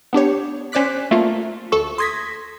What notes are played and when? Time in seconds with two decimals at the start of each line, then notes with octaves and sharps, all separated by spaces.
0.13 B3 D4 G4 C#5
0.72 C#4 C5 D5 D6 F#6 B6
1.11 A3 A#3 F4
1.72 D2 A4 C#6
1.98 C6 D#6 G#6 A#6 B6